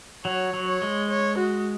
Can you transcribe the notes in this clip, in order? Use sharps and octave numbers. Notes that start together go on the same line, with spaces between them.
F#3 C#5
F#3
C#5
G#3
C#5
F#4